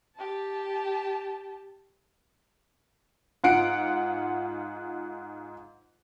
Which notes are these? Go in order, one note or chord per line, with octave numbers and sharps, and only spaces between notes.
G4 A5
G#2 F4 F#5 C7 D7